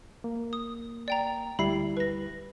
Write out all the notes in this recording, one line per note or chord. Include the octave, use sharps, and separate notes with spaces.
A#3
D#6
D5 G5 A#5
D2 G3 E4 B5 C7
B4 A#6